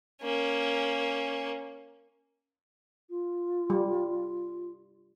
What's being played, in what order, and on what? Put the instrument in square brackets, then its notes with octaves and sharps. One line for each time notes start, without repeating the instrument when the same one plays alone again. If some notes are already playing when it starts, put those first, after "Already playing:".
[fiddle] A#3 C#4
[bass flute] F4
[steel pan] G3